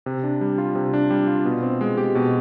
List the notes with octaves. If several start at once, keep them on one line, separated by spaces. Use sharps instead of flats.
C3
D4
G3
F4
C3
D4
G3
F4
B2
C4
G#3
G4
B2